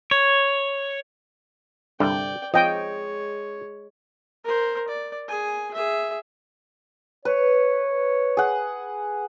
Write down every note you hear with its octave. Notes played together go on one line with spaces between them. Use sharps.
C#5
C2 G2 D3 D5 G5
F3 G#3 C4 C#5 D#5 G5
A#4 C5
D5
G#4 G#5
G#4 E5
B4 C#5
G#4 F#5